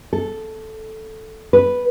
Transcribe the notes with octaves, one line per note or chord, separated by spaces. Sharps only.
A4
B4